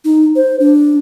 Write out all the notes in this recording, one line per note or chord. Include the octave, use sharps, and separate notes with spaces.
D#4
C5
D4